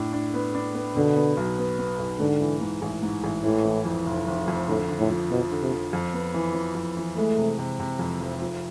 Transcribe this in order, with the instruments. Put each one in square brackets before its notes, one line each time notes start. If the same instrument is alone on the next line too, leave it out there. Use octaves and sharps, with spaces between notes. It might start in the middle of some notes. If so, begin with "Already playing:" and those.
Already playing: [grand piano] A2 D4
D4
B3
D4
B3
[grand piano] B2 [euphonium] D3
[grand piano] B3
B1
B3
B3
B1
[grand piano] G#2 [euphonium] D3
[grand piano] E3
G#2
A1
G#2
A1
[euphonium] A2 [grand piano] E3
[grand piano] E3
F2
F1
F1
F2
[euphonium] A2 [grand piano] D3
[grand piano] D3
[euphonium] A2
[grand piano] F3
[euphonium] B2 [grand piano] F3
[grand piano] D3
[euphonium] C3
[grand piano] F3
F2
B3
E3
E3
F2
E3
[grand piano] G#3 [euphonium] A3
[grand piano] C3
C3
C3
F2
F1
F3